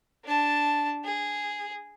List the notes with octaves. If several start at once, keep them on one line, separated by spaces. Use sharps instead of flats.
D4 A5
G#4